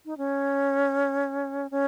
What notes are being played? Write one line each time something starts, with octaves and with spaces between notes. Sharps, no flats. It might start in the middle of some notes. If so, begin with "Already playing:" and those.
D#4
C#4
C#4